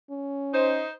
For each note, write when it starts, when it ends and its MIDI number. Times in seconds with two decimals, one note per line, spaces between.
0.11 0.83 61
0.54 0.91 63
0.54 0.91 72